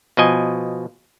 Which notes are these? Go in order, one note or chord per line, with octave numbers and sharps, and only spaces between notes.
B2 F3 D#5 G#5